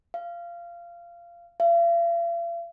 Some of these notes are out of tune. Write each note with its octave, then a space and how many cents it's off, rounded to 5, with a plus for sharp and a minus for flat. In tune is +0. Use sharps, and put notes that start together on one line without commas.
F5 -20
F5 -45